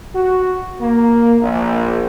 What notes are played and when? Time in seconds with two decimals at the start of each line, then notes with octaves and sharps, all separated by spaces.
0.14 F#4
0.80 A#3
1.40 A#1